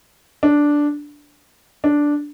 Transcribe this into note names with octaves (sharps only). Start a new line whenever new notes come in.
D4
D4